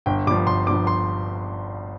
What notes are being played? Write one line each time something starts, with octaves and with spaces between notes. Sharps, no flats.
G1 G5
G2 F3 D6
G1 C6
G2 F3 D6
C6